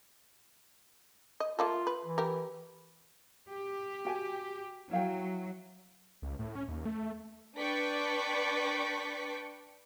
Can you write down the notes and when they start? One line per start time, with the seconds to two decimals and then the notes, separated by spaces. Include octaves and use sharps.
1.40 D#5
1.59 A3 A#3 F4 A4
1.87 B4
2.05 E3
2.18 G4 A#4
3.50 G4
4.05 F#4 G5 G#5
4.91 F#3 E4 F5 G5
6.22 C#2
6.39 A2
6.55 C#4
6.68 D#2
6.86 A3
7.58 D4 B4 D5 G5 C#6 B6